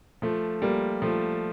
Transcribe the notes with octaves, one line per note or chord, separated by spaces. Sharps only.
F3 A3
G3 A#3
F3 A3